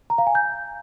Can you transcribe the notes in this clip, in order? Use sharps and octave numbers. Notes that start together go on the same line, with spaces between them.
A#5
F5
G#5
G6